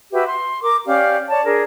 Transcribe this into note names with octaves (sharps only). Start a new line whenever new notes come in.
F#4 G4 B4 E5
C6
A#4 D6
C#4 G4 D5 F5
C#5 D5 A5
D4 G#4 A#4